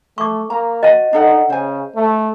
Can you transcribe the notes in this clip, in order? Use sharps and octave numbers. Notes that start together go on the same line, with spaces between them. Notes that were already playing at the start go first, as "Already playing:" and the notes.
A3 C#6 D6
A#3 A#5
F#4 D#5 A5
D4 D#4 A4 F#5
C#3 C5 G#5
A3